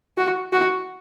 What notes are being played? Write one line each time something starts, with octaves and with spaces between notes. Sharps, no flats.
F#4
F#4